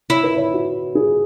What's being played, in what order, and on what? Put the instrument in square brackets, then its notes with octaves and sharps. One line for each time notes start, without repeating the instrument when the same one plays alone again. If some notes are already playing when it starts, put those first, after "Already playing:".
[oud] E4 [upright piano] C#5
[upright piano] B4
C#5
F#4
G#4